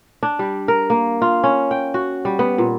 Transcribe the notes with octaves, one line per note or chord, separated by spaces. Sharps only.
D4
G3
A#4
A#3
F4
C#4
G5
F#4
G3
B3
A#2